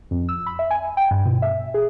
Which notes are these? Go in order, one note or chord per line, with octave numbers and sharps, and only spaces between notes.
F2
E6
B5
E5
G#5
G5
G2
B2
E5
G#4